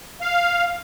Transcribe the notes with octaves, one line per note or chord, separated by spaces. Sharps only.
F5